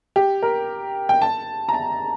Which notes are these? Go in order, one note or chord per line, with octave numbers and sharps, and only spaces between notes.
G4
A#4
G5
A5
A#5
A5